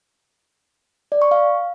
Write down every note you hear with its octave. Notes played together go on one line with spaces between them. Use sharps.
D5
C#6
F5